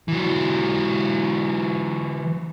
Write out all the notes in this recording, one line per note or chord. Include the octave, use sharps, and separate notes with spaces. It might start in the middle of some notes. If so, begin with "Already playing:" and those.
E3 F#3